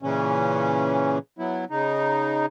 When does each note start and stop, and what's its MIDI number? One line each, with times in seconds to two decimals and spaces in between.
0.03 1.18 46
0.03 1.18 49
0.03 1.18 52
0.03 1.18 61
1.39 1.65 54
1.39 1.65 59
1.39 1.65 64
1.70 2.46 49
1.70 2.46 63